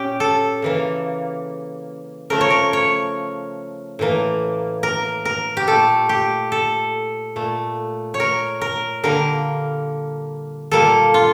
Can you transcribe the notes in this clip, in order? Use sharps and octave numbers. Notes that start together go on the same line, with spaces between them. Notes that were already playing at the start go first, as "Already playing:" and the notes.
Already playing: A#2 C#4 G4
A4
C#3 E3 A#3
C#3 F3 A3 A#4
C#5
A#4
C#5
A2 E3 A#3
A#4
A#4
G4
A#2 A3 A4
G4
A4
A#2 A3
C#5
A#4
A#4
D3 G3 A#3 A#4
A#2 G3 A#3 A4
F4